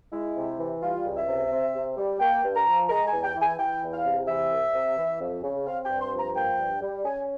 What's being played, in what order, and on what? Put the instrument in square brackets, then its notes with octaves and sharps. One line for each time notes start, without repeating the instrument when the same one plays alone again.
[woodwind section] G#3 E4
C3
E3
G3 F4
C#2
E5
C3
C4
C3
G3
A#3 G5
G2
A#5
F3
G#3 A#5
G#5
E2
G5
E3
G#5
E3 G5
E2
F5
C3
E3 E5
C2
C3
E3
F2
C#3
C4 F5
G5
G2
C6
F3
A#5
A#3 G5
G2
G3
C#4 G#5